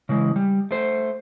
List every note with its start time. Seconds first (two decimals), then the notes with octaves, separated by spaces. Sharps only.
0.09 C#3 E3 G#3
0.36 G3
0.71 A3 C5